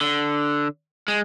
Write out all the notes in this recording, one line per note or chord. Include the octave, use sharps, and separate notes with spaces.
D3
G#3